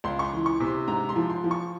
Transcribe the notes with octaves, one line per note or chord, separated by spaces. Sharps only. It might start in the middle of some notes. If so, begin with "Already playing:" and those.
C#2 C6
C#6
C6
E3
C#6
C3
C6
G#2 A#5
C6
F3
C6
F3
C#6